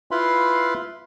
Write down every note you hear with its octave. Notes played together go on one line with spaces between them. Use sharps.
E4 F4 B4 F5 B5 C6